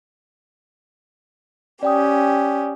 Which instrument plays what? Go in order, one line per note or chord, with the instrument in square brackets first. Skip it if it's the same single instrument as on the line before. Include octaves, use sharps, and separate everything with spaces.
[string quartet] C#4 G4 [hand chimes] D5 G5 D#6